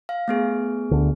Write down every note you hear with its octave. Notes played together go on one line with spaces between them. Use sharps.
F5
A3 B3 G#4
D2 D3